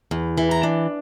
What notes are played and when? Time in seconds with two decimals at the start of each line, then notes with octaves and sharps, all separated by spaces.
0.11 E2
0.38 E3
0.51 A#5
0.63 D4